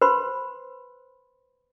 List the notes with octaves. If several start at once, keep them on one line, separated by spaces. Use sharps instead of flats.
B4 C5 B5 C6